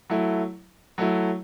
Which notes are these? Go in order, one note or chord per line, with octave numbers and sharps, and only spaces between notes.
F#3 A3 E4
F#3 A3 E4